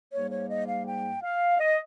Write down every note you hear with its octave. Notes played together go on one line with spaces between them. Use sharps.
G#2 G3 A#3 C#5
C#5
D#5
F5
G5
F5
D#5